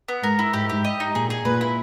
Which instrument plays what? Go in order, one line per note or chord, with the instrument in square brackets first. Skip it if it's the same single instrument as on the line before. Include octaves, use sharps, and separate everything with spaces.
[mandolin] B3
[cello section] G#2 [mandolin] A#4
[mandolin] E4
[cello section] G#2 [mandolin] G4
[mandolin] G4
D#5
D#4
[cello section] A#2 [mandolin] G#4
[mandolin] G#4
[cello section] A#2 [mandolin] B4
[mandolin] E4